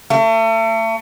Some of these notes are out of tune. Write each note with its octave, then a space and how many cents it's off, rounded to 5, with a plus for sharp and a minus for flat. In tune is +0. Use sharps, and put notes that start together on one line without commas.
A3 +35